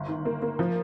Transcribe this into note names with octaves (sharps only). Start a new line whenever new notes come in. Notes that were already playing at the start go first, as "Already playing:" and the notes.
Already playing: G1
D#3
A#3
A#3
F3